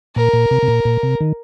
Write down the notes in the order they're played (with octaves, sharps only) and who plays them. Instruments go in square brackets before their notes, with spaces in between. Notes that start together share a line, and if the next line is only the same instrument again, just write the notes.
[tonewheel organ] A#2 [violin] A#4
[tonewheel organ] A#2
C3
C3
A#2
A#2
C3
D#3